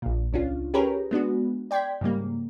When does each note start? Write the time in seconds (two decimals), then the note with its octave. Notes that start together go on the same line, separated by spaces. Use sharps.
0.02 A#1 A#2
0.33 C#2 C#4 D4 F4
0.74 C#4 G4 G#4 A#4 B4 C#5
1.11 G#3 B3 D4 F#4
1.71 D5 G5 C6 G#6 B6
2.01 G#2 C#3 G3 A#3